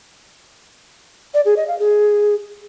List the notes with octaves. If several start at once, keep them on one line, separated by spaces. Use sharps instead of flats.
D5
G#4
D#5
F5
G#4